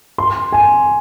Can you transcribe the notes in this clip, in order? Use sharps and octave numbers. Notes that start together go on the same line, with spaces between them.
C6
G#5